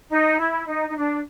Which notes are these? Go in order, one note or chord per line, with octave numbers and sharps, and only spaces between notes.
D#4
E4
D#4
D#4
D4